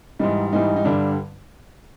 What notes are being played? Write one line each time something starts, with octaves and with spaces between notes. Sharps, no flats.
G#2 E3 G3 D#4
G#2 E3 G3 D#4
D#4
G2 D3 G3 D4